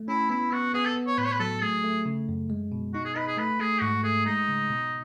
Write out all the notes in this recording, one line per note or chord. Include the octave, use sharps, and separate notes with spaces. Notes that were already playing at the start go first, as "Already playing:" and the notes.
Already playing: A3
C#4 E4
B3 E4
B3 F#4
B3 G#4
A4
B3
C#5
A2 B4
C#5
B4
F#3 A4
A3 G#4
A3
C#3
F#2
G#3
B2
D#4 F#4
G#4
D#4 B4
G#4
A3 B4
A3 G#4
G#2 F#4
A3 G#4
G#3 D#4
C#3
B2